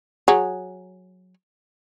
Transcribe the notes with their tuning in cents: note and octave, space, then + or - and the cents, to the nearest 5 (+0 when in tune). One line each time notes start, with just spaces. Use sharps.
F#3 -10 G#4 +0